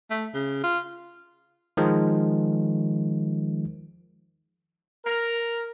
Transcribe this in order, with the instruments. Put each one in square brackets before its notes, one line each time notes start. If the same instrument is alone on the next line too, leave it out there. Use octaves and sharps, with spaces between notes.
[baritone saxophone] A3
C#3
F4
[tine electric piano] D#3 F3 G#3
[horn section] A#4